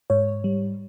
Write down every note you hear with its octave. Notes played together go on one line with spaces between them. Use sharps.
G#2 C#5
G3